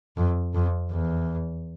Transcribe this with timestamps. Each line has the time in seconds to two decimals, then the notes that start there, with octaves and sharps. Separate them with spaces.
0.17 F2
0.54 F2
0.91 E2